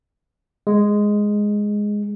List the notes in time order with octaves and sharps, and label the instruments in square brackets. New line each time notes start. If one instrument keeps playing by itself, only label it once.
[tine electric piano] G#3